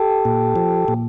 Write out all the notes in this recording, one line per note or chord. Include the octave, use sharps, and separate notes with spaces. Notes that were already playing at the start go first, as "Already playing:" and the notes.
Already playing: G4 A4
A#2
F3
A#2